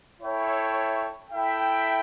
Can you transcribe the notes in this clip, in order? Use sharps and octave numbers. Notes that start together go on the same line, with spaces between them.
E4 A4 C#5 E5 G5
E4 A4 E5 G5